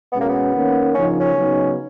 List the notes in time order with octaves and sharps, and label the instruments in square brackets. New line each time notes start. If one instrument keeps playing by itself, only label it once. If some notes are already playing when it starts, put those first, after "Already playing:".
[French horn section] B2 G#3 C#4 [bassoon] B3
[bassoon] A#3
B3
[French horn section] D#3 A#3 C#4
[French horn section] C#3 F3 A#3 D#4 [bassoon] C#4
[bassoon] C#4
[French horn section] C#3 F#3 B3 D#4